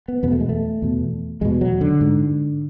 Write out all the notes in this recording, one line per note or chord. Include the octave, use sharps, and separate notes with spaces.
B3
E2 B2 B3
A3
G#3
A3
E2 B2
E2 B2 G#3
F#3
D3
G#2